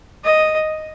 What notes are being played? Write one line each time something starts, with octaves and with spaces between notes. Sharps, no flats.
D#5